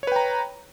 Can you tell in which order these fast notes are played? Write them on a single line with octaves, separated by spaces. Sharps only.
C#5 B4 G5 A#5